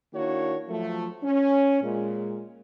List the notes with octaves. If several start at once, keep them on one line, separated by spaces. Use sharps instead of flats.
D#3 A#3 D4 E4 F#4 C#5
F3 F#3 A3
C#4
A#2 G#3